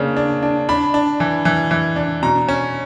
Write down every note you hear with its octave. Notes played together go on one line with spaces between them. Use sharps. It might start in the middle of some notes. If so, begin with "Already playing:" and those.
Already playing: C#3 A#3 D4
D4
D4
D4 B5
D4
E3
E3
E3
D4
B2 A#5
C#4